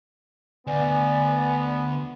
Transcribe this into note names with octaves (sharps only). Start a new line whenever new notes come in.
D2 B3 D5 G#5